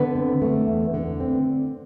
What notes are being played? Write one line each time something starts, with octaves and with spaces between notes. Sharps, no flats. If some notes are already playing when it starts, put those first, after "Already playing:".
Already playing: D3 B3 B4
C4
A3
E2
D3
C4